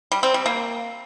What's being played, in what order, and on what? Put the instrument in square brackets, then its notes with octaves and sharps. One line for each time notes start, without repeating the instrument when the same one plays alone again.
[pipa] G3
C4
G3
A#3